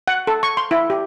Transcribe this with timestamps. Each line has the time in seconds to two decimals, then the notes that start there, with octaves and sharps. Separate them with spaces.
0.08 F#5
0.27 A4
0.43 C#6
0.57 C6
0.71 E4
0.90 G4